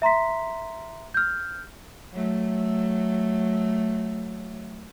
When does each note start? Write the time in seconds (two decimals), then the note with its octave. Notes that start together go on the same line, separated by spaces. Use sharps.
0.02 E5 A#5 C6 B6
1.14 F6 G6
2.13 F#3 A3